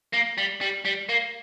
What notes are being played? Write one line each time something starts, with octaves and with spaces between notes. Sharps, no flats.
A#3
G3
G3
G3
A#3